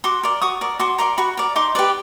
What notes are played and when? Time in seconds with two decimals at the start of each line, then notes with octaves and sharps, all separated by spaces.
0.04 F#4 C6 D6
0.23 A#4 D5
0.41 F#4 C#6 D#6
0.61 A#4 D5
0.79 F#4 C6 D6
0.98 A#4 D5 A#5 C6
1.18 F#4 B5 C#6
1.37 A#4 D5
1.56 D#4 C6 D6
1.75 G4 B4 D5